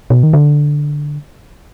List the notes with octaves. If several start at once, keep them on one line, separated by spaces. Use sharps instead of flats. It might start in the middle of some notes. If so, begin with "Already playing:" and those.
B2
D#3
D3